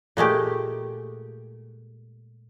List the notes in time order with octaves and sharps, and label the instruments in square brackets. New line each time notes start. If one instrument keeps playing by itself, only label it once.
[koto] A#2 G#3 A3 G4